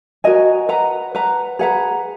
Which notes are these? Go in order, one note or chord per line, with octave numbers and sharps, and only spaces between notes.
F#4 A#4 D#5 G#5
B4 F#5 A#5
B4 F#5 A#5
G#4 B4 F#5 A#5